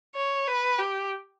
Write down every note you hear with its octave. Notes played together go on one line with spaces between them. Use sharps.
C#5
B4
G4